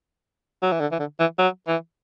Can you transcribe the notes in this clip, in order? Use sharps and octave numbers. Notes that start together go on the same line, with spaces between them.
F#3
E3
D3
E3
D3
E3
F#3
E3